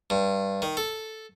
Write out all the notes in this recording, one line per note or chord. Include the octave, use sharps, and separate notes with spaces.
G2
D#3
A4